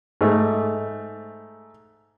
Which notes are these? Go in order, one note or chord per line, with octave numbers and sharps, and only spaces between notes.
G#2 A3